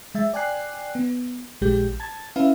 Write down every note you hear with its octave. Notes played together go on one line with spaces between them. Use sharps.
G#3 E5 A6
D5 G5 G#5 F#6 C7
B3
A#1 G#3 G4 G6
A5 G#6 A6
C#4 E4 B4 E5 F5